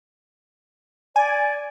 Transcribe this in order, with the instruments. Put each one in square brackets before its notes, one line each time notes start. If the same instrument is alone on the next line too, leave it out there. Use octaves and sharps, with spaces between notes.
[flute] D5 [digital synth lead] G#5